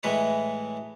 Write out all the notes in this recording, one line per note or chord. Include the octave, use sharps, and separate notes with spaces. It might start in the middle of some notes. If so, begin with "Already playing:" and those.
A2 E3 G#3 B4 C#5